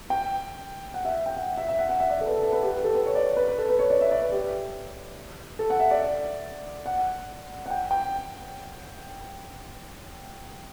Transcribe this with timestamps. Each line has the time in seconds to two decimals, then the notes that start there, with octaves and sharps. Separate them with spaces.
0.10 G5
0.94 F#5
1.05 E5
1.26 G5
1.37 F#5
1.58 E5
1.68 E5
1.79 F#5
1.89 F#5
2.00 E5
2.10 D5
2.21 A4
2.26 B4
2.31 A4
2.42 A4
2.52 B4
2.63 G4
2.73 G4
2.84 A4
2.95 B4
3.06 C#5
3.15 D5
3.37 B4
3.48 B4
3.58 A4
3.69 B4
3.79 C#5
3.90 D5
4.01 E5
4.11 D5
4.22 B4
4.32 G4
5.59 A4
5.70 F#5
5.80 E5
5.91 D5
6.86 F#5
7.66 F#5
7.70 G5
7.91 G5